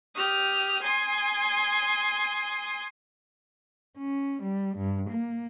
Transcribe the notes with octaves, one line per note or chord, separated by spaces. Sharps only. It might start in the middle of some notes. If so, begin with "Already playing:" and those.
G4 D#6 F6
G#5 C6 D#6
C#4
G3
G2
A#3